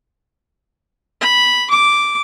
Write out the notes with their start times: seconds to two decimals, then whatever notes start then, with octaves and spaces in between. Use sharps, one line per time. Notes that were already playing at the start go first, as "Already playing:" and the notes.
1.21 B5
1.70 D6